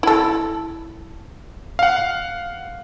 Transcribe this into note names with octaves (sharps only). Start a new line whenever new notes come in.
E4 A4
F5 F#5